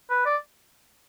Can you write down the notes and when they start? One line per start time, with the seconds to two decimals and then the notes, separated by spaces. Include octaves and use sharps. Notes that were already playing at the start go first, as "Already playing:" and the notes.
0.10 B4
0.25 D5